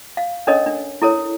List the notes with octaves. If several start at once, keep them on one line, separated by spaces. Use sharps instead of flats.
F5
C#4 D4 A4 A#4 C#5 D#5
D4
E4 A4 A#4 C#5